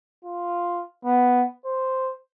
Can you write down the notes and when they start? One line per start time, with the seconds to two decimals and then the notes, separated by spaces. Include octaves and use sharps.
0.25 F4
1.05 B3
1.65 C5